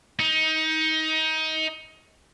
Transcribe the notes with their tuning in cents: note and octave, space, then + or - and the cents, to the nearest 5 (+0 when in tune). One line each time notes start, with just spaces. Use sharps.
D#4 +25